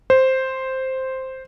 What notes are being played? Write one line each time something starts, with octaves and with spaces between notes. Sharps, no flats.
C5